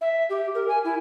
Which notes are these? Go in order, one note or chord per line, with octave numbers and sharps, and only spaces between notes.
E5
G4
A#4
G#5
E4